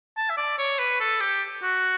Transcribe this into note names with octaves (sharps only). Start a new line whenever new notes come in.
A5
E5
D5
C#5
B4
A4
G4
F#4